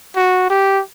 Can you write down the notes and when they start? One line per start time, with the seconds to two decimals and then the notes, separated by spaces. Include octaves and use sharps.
0.16 F#4
0.50 G4